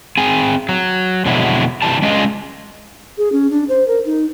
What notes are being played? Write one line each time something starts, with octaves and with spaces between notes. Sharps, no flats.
C4 G#4 G#5
F#3
F2 B2 D3 F#3 G#3 E4
C3 E3 G3 A5
G#3 C#4 D4 F4 G#4 D#5
G#4
C#4
D4
C5
A#4
D#4